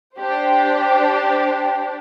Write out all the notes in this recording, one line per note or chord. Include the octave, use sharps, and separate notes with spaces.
D4 G4 C5